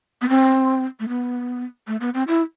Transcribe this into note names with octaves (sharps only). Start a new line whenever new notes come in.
B3
C4
A3
B3
A3
B3
C4
E4